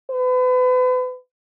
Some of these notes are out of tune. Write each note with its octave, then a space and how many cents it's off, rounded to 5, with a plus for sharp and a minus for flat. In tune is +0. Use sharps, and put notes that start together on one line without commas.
B4 +35